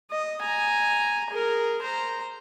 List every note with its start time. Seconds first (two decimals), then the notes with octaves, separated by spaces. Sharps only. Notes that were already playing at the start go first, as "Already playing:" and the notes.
0.11 D#5
0.41 G#5 A#5
1.31 G#4 A#4
1.82 C5 A#5